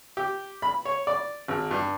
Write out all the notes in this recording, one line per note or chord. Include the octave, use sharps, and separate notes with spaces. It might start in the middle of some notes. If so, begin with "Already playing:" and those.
G4
B5
C#5
D5
G#1
G2